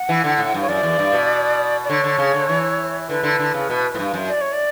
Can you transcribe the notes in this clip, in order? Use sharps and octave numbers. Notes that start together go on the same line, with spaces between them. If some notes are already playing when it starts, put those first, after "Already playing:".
Already playing: F#5
E3
D3
A2
G2
C#5
F#2 D5
E2
G2
B2
D5
D3 C#5
D3
C#3
D3
E3
D3 B4
D3
D3
C#3
B2
A2
G2
F#2
D5
C#5
D5